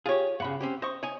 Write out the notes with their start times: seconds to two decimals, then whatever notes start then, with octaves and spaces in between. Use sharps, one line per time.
0.06 F4 G4 G#4 C#5
0.40 G2 C#3 F#5 B5
0.60 C4 C#4 G4
0.82 C5 D#5 C#6
1.03 C#5 D#5 G#5